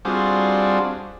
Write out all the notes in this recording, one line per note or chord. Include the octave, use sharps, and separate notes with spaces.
G3 C4 D4 F4 F#4 G#4